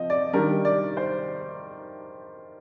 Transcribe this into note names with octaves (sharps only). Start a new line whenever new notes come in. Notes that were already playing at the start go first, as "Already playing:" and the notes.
Already playing: F3 C4 D#5
D5
D#3 G3 D4 A#4
D5
C5